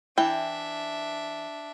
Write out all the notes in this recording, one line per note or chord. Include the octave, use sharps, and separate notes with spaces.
E3 D4 E5 G5